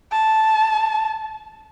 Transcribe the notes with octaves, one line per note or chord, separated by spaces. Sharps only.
A5